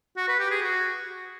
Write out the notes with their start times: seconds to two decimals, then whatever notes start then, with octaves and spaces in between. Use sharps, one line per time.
0.17 F#4
0.28 B4
0.39 G4
0.51 G#4
0.62 F#4